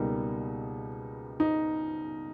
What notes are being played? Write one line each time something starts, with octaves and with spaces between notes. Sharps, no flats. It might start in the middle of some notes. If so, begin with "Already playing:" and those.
Already playing: C#2 B2 G3 A#3 D#4
D#4